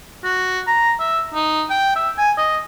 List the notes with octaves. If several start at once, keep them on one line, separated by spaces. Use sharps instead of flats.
F#4
A#5
E5
D#4
G5
E5
G#5
D#5